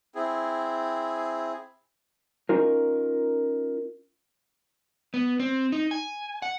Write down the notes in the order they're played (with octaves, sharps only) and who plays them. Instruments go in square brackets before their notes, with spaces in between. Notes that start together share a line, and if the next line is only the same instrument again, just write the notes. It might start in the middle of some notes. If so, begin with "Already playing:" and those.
[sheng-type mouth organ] C4 E4 G#4
[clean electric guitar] C#4 D#4 F4 A#4
[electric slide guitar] B3
C4
D#4
G#5
F#5